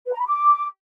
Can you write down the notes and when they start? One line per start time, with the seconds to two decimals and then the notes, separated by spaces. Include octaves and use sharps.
0.06 B4
0.13 A#5
0.19 B5
0.25 D6